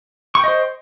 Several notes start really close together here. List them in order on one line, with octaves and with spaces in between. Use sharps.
C#6 G5 D#5 C5